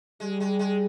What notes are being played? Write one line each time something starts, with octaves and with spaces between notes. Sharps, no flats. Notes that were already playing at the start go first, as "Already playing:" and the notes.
G3 G#3
G#3
G#3